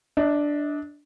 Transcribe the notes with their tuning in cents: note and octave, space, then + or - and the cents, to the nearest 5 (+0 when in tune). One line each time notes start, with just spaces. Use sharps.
D4 +0 D#5 +40